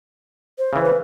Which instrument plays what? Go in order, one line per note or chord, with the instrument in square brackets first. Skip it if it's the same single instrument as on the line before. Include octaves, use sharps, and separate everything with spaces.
[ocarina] C5
[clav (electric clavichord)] C#3 E3
[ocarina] B4